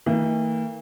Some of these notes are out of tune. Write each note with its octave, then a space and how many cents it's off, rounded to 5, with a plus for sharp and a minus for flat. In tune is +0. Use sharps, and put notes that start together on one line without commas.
E3 -45 A#3 -45